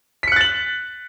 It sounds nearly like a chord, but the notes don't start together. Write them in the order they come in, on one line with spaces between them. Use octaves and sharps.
B6 C#7 F#6 A6 F#7